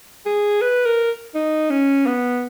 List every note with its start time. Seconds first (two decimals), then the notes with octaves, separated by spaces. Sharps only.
0.26 G#4
0.61 B4
0.85 A#4
1.35 D#4
1.70 C#4
2.06 B3